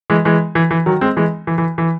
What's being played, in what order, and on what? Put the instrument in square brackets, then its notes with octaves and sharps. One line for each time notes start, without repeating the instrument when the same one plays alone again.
[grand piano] E3 G#3
E3 G#3
E3
E3
D#3 F#3
G#3 C4
E3 G#3
E3
E3
E3